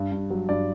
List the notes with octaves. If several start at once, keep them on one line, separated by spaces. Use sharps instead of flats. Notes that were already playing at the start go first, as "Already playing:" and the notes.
Already playing: G2
G2
F#3
G2 D5